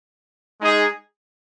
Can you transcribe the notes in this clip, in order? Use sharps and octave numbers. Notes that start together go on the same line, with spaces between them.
G#3 D#4 G#4